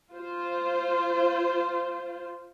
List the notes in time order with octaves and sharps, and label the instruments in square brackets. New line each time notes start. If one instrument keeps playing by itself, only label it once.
[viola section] F4 C5